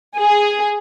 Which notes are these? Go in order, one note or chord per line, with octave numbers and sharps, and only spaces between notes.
G#4